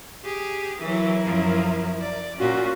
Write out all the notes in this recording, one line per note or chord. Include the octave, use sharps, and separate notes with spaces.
G4 G#4
E3 F#3 E4 A#4
F#2 F3
D5
A#2 C#4 F4 F#4